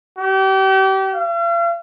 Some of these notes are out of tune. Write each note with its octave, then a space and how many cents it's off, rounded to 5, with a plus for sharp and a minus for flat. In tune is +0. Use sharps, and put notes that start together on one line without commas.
G4 -35
F5 -45